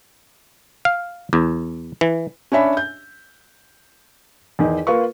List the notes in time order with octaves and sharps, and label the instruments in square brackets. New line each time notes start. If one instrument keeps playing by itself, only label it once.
[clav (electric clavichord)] F5
E2
E3
[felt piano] C#4 D4 C#5 E5 B5
G6
E2 D#3
A#3 F4 B4 C#6